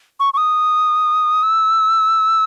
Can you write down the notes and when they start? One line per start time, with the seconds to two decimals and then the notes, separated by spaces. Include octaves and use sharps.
0.20 C#6
0.34 C#6
0.37 D#6
1.43 E6